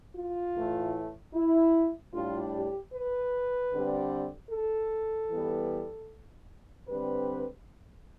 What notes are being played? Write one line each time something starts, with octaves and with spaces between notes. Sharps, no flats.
F4
A2 E3 A3
E4
A2 G3 D4 F4
G4
B4
D3 G3 C4
A4
E3 G3 B3
D3 G3 C4 B4